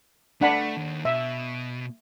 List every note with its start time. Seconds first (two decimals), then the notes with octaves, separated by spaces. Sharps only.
0.41 A3 D4 F#5 B5
0.77 D#2
1.05 B2 E5